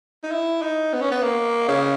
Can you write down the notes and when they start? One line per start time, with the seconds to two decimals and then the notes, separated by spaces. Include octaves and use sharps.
0.23 D#4
0.31 E4
0.62 D#4
0.93 B3
1.01 C#4
1.11 B3
1.22 A#3
1.68 C#3